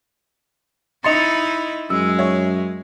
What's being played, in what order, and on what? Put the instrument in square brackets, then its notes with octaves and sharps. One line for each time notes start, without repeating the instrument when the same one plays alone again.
[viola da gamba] D#4 E4 [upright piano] D#5 C6 [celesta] A6 C#7 F7
[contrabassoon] F#2 [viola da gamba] G#3 [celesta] E6
[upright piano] C#5 E5